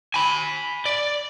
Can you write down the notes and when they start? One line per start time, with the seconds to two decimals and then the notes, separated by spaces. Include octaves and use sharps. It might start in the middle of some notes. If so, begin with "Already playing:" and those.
0.14 G#5 B5
0.86 D5